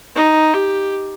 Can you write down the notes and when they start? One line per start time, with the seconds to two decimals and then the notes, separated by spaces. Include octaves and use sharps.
0.16 D#4
0.53 G4